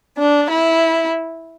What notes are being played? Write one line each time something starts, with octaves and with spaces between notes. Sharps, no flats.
D4
E4